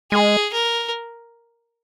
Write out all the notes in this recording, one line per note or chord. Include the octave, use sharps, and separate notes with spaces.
G#3 G#4
A#4